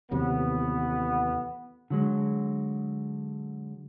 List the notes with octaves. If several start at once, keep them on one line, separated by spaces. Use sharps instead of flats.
A1 D#2 C3 F#3 B3
D3 F#3 G#3